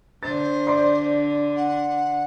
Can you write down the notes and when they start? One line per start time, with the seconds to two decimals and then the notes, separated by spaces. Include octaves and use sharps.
0.23 D3 C5 A6
0.67 D5 C6
1.56 F#5